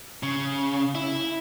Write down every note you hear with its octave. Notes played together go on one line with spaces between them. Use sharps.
C#3
E4